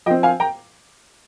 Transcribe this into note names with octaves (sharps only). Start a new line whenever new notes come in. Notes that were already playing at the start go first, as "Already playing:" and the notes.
F3 C4 D#5 G5
F5 G#5
G5 A#5